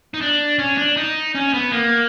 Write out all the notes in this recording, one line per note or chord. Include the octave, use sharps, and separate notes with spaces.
D#4
D4
C#4
D4
D#4
C#4
B3
A#3